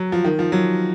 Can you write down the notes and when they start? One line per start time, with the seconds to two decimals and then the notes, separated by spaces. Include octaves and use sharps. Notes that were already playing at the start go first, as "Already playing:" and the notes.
Already playing: F#3
0.12 F3
0.24 D#3
0.39 F3
0.52 F#3